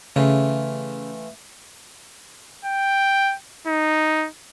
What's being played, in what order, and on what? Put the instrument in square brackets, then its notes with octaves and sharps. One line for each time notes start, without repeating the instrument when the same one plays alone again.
[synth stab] C#3 [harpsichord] E3 A3 F4
[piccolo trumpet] G5
D#4